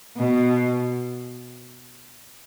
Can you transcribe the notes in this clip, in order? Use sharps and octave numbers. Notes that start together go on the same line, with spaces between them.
B2